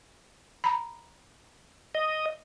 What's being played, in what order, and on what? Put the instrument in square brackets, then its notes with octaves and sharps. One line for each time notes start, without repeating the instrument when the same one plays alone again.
[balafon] A#5 B5
[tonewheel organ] D#5